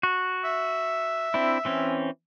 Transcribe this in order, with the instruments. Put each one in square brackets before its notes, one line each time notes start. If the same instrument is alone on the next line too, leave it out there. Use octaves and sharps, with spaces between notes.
[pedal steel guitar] F#4
[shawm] E5
[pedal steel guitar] C4 D4 E4
E3 C4 C#4